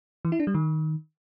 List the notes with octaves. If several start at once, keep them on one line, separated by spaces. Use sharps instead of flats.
E3
E4
D4
G3
D#3